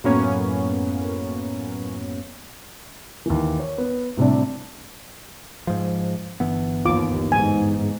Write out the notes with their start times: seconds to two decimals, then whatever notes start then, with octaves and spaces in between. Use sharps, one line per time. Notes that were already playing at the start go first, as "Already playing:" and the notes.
0.04 F#2 A2 A#3 B3 C#4
3.26 D#2 E3
3.60 C#5
3.78 B3
4.17 A2 C3 G3 D4
5.67 G#2 F3
6.40 G1 E3 B3
6.85 D#2 F4 D6
7.32 G#2 G#5